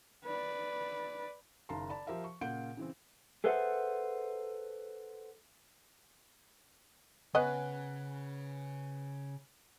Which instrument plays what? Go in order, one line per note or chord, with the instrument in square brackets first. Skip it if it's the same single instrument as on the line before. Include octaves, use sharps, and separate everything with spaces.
[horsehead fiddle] B4 D5
[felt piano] F#1 D#3 F5 A5 A#5 C6
D5 A5 B5
F3 G4 A#4 C5 E5 F5
C#6
A#2 C#3 F5 F#5 G6 D7
C#3 E3 C4
[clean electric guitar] G#4 A4 B4 C5 E5 F#5
[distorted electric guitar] C#3 [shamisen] B3 C#4 D#5 [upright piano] B4 [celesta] F#5 G#5 F#6